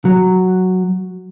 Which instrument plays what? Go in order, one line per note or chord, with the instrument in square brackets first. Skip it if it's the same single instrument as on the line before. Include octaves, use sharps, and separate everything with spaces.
[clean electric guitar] F#3